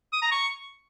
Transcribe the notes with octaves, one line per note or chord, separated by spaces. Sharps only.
D#6
A#5
C#6